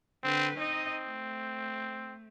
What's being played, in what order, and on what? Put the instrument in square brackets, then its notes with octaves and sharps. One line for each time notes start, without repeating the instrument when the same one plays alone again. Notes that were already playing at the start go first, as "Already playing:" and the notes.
[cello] D3 B4 [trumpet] C4
[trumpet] C4 [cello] D#4 D#5
[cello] A3